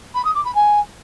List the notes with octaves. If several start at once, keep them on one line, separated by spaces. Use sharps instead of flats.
B5
D#6
D6
B5
G#5